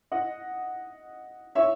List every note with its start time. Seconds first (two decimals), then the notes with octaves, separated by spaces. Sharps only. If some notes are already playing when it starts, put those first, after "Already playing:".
0.12 D#5 F#5
1.55 C#5 E5